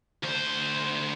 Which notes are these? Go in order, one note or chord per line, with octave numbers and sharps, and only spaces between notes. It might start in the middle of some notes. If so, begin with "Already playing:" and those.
D2 C5